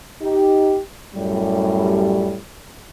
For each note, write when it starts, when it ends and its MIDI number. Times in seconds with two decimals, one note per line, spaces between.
0.21 0.78 63
0.21 0.78 67
1.15 2.36 42
1.15 2.36 45
1.15 2.36 55